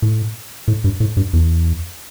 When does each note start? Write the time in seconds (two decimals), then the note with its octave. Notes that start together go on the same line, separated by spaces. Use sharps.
0.02 A2
0.68 A2
0.84 G2
1.00 A2
1.17 G2
1.33 E2